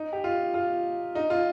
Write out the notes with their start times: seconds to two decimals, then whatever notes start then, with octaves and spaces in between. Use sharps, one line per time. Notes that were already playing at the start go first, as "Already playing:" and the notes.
Already playing: D#4
0.13 G4
0.24 F4
0.54 F4
1.15 D#4
1.30 F4